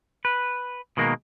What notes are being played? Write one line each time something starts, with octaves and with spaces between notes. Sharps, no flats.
B4
B2 D#3 G#3 A#3